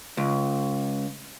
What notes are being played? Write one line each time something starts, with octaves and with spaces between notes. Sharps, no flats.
C#2